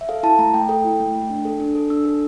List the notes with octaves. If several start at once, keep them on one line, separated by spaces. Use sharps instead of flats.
E5
A4 F5
E4 A5
A3 A#5
A3 G5
A4 G5
E4
A3
A3
D4
A4
D4
A4
D4 E6
A4